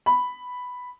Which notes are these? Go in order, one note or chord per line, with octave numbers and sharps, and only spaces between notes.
B5